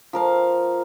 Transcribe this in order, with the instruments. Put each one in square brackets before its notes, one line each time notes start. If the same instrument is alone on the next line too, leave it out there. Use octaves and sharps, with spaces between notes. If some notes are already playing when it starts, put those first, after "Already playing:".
[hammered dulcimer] F3 A#4 F5